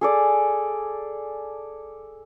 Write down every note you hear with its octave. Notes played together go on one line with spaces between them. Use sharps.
G#4 A4 D5